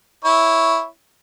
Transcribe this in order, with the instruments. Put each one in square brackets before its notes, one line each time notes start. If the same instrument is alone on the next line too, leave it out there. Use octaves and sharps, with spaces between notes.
[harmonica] E4 C#5